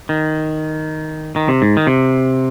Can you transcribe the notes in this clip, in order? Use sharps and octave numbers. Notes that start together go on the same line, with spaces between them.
D#3
D#3
C3
G#2
D#3
C3